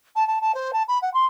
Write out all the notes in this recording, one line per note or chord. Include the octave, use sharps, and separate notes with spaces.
A5
A5
A5
C5
A5
B5
F#5
C6